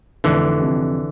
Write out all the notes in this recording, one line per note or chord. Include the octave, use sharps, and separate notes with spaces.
F1 D3 E3
F2 C3